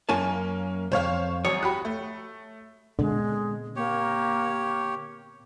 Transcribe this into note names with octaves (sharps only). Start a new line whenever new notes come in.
F#2 A#3 C#4 G#5 A5
C2 F2 C5 C#5 F5
G#1 F#2 C#5 D#6
F#4 G4 B5
A3
A#2 D3 G#3 B3 C4
A#3 G4 C#5